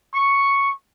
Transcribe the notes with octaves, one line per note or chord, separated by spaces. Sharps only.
C#6